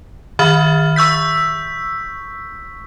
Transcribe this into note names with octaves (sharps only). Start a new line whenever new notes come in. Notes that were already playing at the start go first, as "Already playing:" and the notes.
D#3 E5 B5 F6 A6
C#6 E6 G6 B6